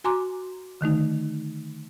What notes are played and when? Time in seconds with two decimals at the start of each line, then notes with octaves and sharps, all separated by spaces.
0.04 F#4 G#5 A#5 C6 D6
0.81 D3 D#3 A3 D#4